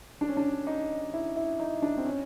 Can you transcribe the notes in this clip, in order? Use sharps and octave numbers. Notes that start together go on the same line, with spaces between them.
D4
C#4
D4
D#4
E4
E4
D#4
D4
C4
C#4